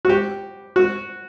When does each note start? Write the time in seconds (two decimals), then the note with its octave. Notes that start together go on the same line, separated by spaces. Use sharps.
0.05 F#4
0.09 G4
0.76 F#4